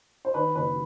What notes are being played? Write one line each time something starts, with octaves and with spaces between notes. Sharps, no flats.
C5
D#3 B4
F#1 B4